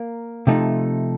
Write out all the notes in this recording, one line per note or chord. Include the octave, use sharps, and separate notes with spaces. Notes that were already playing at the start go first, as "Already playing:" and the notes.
Already playing: A#3
C3 F3 A3 D#4